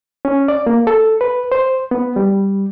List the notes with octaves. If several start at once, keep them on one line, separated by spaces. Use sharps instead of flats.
C#4
D5
A#3
A4
B4
C5
B3
G3